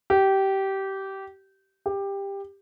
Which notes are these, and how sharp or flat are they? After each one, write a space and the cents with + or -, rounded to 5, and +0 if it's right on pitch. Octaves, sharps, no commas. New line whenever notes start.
G4 -20
G4 +15